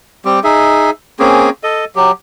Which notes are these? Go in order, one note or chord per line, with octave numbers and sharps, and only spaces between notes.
G3 C4 G4
D#4 G#4 E5
A#3 C4 C#4 G#4
A4 D#5
F#3 G4